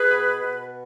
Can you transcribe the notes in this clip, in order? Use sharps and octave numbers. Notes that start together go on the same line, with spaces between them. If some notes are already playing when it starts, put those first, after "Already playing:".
Already playing: G#4 B4
B2
B2